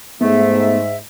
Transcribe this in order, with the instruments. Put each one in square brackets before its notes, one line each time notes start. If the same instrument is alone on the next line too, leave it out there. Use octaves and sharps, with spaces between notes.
[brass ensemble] G#2 [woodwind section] A3 [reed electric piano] B3 [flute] E5